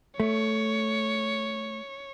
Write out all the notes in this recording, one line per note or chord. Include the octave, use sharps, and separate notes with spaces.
A3 C#5